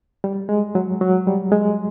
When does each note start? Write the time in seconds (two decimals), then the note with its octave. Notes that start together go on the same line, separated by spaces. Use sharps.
0.24 G3
0.49 G#3
0.75 F#3
1.01 F#3
1.27 G3
1.52 G#3